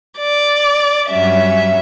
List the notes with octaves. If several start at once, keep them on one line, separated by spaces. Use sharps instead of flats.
D5
G2 F#3 C#4 E5